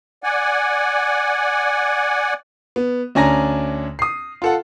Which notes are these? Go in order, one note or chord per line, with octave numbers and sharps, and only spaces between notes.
D5 F#5 G#5
B3
D2 C#4 D4 G#5 A#5 A#6
D#6 C7
F4 A4 F#5